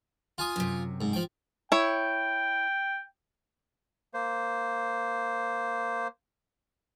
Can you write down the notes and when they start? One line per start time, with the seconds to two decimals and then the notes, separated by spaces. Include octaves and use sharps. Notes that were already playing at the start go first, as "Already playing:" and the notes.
0.38 F4 G#5 D#6
0.56 F#2 C3
1.01 G#2
1.13 F3 G5
1.72 E4 C#5 G5
4.14 A#3 C5